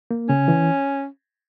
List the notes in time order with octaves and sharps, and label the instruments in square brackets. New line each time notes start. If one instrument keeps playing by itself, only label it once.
[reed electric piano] A#3
[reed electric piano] C#3 [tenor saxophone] C#4
[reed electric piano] E3